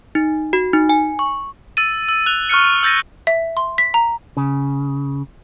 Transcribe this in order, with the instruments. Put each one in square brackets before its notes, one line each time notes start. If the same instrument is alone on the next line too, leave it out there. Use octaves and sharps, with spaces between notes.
[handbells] D#4
F#4
D#4
G#5
C#6
[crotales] E6 A6 D#7
E6
F#6 F7
C#6 F6 F#6 C#7
E6 G6 A6 A#6 D#7
[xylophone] E5
C6
B6
A#5
[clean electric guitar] C#3